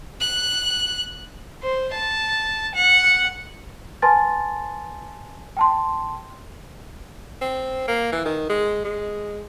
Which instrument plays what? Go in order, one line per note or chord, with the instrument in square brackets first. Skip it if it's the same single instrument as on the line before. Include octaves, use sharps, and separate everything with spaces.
[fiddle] F#6
[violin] C5
A5
F#5
[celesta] B4 G#5 A5 C6 A6
G5 A5 C6
[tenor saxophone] C4
A#3
E3
D#3
G#3
G#3